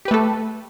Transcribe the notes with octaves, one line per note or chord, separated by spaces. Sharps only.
A3 G4 A4 B4